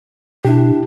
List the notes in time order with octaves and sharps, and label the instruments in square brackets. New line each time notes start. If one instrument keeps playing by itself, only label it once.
[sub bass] B2 [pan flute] D4 [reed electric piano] E4 G4